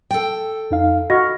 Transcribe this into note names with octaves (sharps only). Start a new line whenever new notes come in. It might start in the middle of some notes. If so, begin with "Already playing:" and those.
A4 G5
F2 D#4 F5
F#4 D#5 F#5 C#6 F6 A#6